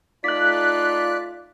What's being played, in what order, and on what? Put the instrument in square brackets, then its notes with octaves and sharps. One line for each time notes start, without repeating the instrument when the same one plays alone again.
[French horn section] A3 D#4 F4 [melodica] D5 [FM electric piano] F#6 B6